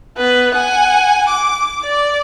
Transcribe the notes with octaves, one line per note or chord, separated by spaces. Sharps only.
B3 B4
F#5 G#5
D6
D5